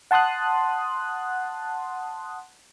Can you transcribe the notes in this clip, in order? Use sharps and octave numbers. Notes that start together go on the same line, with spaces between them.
F#5 A5 C6 D#6 F#6